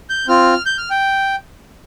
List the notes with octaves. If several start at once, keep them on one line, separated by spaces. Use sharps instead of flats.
G6
C4 F4 F6
G6
F6
G5